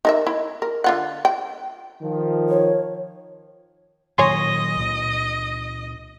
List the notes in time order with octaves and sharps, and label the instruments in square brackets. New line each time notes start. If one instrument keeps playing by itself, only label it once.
[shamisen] D#4 A#4 E5
E4
A#4
D3 F4 F#5
G5
[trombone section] D#3 F3
[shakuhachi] C#5
[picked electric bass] A#2 D#3 F#3 [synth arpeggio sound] C#5 G#5 C6 [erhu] D#5
[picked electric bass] C#2 A#2